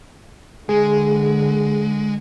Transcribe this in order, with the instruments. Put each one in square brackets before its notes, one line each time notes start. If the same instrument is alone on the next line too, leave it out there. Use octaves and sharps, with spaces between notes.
[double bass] D3 [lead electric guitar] G#3 [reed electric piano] G#4